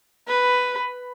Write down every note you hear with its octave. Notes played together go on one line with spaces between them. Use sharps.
B4